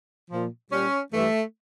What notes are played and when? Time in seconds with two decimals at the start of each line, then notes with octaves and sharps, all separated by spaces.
0.31 A#2 F3
0.71 A#2 G3 C#4
1.12 G2 E3 G3 A3